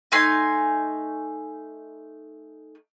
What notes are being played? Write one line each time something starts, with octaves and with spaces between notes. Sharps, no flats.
A3 D#4 G#5 C6